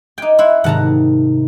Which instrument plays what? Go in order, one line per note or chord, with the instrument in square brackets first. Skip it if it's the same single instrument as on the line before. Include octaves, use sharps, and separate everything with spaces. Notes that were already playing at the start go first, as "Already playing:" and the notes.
[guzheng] D#4 G5 [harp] D6 F#6 G#6
[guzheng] E4 F#5 [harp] C6
[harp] G#2 C3 D#3 [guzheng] F#5 A5 A#5